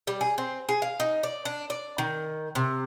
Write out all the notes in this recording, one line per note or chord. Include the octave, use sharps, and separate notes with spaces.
G3
G#4
C4
G#4
F5
D#4
D5
D4
D5
D#3
C3